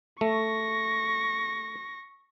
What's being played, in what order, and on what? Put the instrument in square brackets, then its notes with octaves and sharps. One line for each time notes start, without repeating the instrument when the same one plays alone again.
[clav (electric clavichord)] A3 [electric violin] C#6 A#6